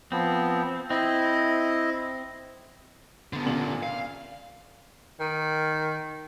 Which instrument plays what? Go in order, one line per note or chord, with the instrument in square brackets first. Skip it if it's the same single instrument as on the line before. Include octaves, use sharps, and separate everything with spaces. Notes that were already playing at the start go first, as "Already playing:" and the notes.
[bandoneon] F3 B3 [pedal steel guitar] C4
[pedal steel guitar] C4 [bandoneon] E4 D#5
[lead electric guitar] D3 B3
[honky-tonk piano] A#2 C#3 F#7
[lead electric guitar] F5
[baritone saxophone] D#3